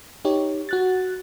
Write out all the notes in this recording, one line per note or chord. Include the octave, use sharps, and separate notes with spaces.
D#4 G4 C#5
F#4 F#6 A6